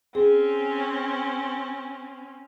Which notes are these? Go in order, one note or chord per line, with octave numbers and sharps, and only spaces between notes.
C4 C#4 G#4